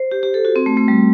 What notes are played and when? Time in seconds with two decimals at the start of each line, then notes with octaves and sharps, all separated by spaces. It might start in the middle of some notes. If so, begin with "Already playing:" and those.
Already playing: C5
0.11 G4
0.23 G4
0.34 A4
0.45 F#4
0.56 C4
0.66 A3
0.77 A3
0.88 G3